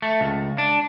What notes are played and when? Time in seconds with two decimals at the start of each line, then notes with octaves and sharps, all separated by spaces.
0.02 A3
0.21 C#2
0.58 D4